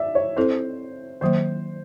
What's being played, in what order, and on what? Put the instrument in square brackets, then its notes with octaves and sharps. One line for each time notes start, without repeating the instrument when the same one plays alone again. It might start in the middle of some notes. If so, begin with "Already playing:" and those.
Already playing: [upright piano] D5 E5
C#5
[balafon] C4 E4 A4 [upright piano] C5
[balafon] D#3 F#3 A#3 [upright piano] C5